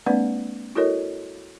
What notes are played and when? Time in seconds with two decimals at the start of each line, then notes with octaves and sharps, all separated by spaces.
0.06 G#3 A#3 C4 D4 B4 D5
0.75 E4 F#4 A4 A#4 C#5 D#5